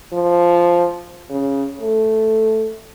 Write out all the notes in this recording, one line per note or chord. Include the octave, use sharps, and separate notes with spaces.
F3
C#3
A3